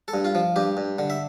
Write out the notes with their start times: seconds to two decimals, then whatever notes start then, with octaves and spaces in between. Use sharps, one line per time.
0.08 A4
0.14 G2
0.25 F4
0.35 F3
0.56 G2 G4
0.77 G2
0.99 D3
1.10 E5